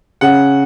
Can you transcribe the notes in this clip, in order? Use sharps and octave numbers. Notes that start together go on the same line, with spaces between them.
C#3 F#5